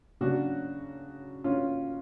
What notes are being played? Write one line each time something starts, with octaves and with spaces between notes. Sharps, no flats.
C#3 F#3 D4 F#4
C#4 F4